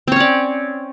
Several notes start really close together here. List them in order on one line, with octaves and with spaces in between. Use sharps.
C4 C#5 C#4 D5